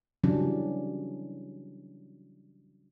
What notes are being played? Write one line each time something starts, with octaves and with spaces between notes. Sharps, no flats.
C#3 E3 F#3 G3 C#4 D4